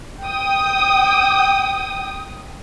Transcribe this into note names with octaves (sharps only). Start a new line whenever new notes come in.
G5 D#6